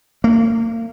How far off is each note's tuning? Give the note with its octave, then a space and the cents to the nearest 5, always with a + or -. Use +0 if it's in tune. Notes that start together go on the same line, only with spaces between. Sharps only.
A#3 -35